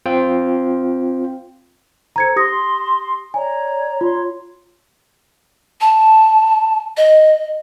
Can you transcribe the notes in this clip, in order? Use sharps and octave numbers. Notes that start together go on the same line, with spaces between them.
C4 F4 G5
A4 C5 A#5 G#6 C#7
G4 C6 D#6 A#6
C#5 D5 G#5 A#5
F4 C#5 A#5 C6
A5
D#5